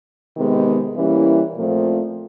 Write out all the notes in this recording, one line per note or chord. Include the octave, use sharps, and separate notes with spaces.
C3 D#3 G#3 B3
E3 G3 A#3 C#4 E4
A#2 F3 A3 C4